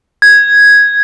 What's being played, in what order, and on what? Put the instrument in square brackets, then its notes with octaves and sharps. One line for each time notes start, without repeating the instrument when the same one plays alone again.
[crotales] G#6